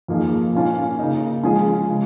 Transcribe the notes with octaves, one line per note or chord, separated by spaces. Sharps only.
F2 F3 A#3 D#4 G#4
A#2 A#3 C#4 F4
C#3 A#3 D#4
F3 G#3 C#4 F4 G#4
C#3 G#3